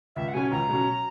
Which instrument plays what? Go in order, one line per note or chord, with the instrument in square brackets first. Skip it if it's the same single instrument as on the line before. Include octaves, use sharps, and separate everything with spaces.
[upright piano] C#2 [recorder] E5
[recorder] F#5
[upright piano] B2 F#3 C#4 [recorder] G#5
[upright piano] C#2 [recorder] A#5
[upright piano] B2 F#3 C#4